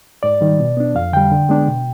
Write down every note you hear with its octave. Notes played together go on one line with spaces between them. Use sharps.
G#2 D5
D#3 G3
B2
B3 D4
F2 F5
D3 G3 G5
D3
G#3 B3 D4
B2